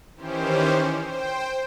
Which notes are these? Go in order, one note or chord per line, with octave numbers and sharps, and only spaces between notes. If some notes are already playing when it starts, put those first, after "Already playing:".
D#3 E3 C#4 G4 C5
C5 G5